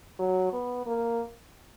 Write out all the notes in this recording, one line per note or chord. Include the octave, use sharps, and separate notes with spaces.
F#3
B3
A#3